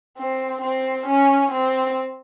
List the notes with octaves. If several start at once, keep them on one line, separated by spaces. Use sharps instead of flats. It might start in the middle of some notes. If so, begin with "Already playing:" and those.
C4
C4
C#4
C4